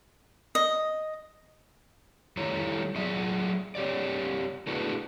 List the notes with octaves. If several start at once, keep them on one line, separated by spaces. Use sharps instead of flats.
D#5
D#3 G3 E4 A4 C#5 A#5
F#3 G#4 D5 E5
C4 G4 C#5 D5
A3 D4 E4 F#4 G#4 B4